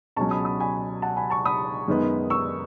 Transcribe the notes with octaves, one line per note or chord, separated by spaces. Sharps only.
C#2 B2 F#3 C#4 A5 C#6
B5 D#6
B5 D#6
G#5 B5
F#5 A5
G#5 B5
A5 C#6
B5 D#6
F#2 D#3 G#3 B3
C#6 E6